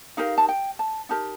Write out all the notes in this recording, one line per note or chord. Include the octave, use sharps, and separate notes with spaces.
D#4 G4 A#4 F5
A5
G5
A5
D#4 G4 A#4 A5